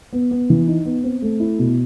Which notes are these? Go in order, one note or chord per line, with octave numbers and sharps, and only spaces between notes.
B3
B3
E3
D#4
B3
C4
A3
E4
B2